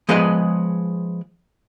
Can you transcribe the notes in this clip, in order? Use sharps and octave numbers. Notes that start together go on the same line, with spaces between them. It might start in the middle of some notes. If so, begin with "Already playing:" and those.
F3 G#3 B3 G#4 B4 D#5